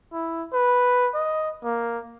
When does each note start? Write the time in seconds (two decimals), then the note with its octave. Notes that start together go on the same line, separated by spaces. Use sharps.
0.13 E4
0.53 B4
1.14 D#5
1.64 A#3